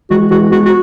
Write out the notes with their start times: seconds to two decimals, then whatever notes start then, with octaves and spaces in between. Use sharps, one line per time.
0.10 E3 G#3 F#4
0.31 E3 G#3 F#4
0.51 G#3 B3 F#4
0.65 F#4